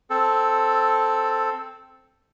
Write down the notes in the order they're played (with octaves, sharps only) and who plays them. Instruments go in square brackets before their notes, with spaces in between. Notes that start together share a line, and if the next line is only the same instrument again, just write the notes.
[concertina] C4 A4